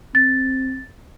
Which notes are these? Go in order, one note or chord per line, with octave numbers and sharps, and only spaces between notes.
C4 A6